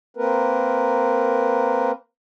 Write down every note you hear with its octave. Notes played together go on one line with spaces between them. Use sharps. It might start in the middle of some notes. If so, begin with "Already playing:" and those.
A#3 C4 A#4 B4